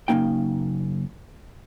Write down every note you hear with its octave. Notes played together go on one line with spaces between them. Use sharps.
F#2 C#3 A#3 D#4 G5